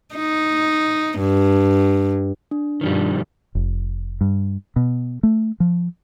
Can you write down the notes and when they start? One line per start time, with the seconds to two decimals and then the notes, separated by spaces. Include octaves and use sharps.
0.15 D#4
1.19 G2
2.51 D4
2.81 G2 B2 D#3 F3 G3
3.55 F1
4.21 G2
4.76 B2
5.23 A3
5.60 F3